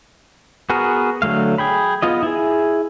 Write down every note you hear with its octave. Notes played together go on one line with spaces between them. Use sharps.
B3 F#4 G#4 A#4
D3 F#3 A3 F5
G#4 G5 B5
B3 F4 D#5
E4 G#4